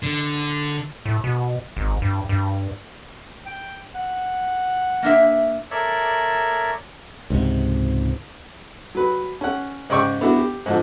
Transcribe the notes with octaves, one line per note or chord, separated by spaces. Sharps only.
D3
A2
B2
G#1
G2
G2
G5
F#5
A#3 D4 E5
A4 A#4 C#5 D5 E5
C#2 G#2 C3
F#3 B4
C#4 F#5
G#2 C#3 D5 G5 C#6
B3 D4 E4 F#4
G4
G#2 D3 F3